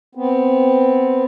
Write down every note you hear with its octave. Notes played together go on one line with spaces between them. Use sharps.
B3 C4